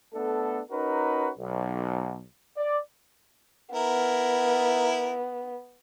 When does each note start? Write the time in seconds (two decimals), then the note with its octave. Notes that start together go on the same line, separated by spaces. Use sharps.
0.14 A3 B3 D4 A4
0.71 C#4 D#4 F#4 A#4 B4
1.38 B1
2.57 D5
3.75 B3 E4 A#4